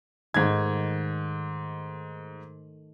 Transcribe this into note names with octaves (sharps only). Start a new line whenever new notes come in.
G#2 D#3 A3 G#6